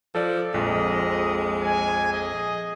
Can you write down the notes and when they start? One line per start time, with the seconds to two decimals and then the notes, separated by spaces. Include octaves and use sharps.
0.15 F3 A4 D5
0.54 A#1 F2 G#3 D#5
1.61 G#5
2.12 G#4 D#5